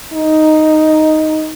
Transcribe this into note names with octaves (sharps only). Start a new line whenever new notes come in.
D#4